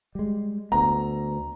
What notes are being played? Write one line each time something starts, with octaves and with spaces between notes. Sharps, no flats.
G3 G#3
D2 B3 A#5